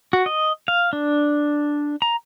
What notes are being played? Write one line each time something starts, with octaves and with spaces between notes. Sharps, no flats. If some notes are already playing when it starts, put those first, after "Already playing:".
F#4
D#5
F5
D4
A#5